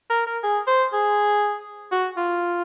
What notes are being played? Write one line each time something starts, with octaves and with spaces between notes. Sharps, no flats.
A#4
A#4
G#4
C5
G#4
F#4
F4